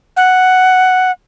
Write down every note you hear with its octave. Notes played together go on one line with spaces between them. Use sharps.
F#5